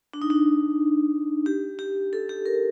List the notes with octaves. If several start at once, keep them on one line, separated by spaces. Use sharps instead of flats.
D4
D#4
D4
G4
G4
A4
G4
A#4